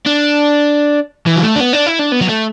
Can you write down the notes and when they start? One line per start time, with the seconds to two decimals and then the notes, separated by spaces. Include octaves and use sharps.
0.06 D4
1.26 E3
1.35 F#3
1.43 A3
1.56 D4
1.60 B3
1.73 D4
1.86 E4
1.99 D4
2.12 B3
2.21 F#3
2.29 A3